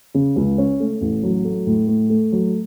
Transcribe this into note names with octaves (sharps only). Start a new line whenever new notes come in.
C#3
C#2
C#4
A3
A1
F#3
A3
A2
A3
A3
F#3